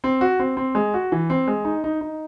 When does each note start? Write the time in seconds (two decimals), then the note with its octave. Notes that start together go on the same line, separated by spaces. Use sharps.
0.04 C4
0.21 F#4
0.39 C4
0.57 C4
0.75 G#3
0.94 F#4
1.12 E3
1.30 C4
1.48 G#3
1.65 D#4
1.84 D#4
2.01 D#4